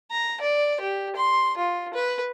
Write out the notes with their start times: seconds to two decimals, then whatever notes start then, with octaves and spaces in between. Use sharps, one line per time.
0.11 A#5
0.41 D5
0.80 G4
1.16 C6
1.57 F4
1.93 B4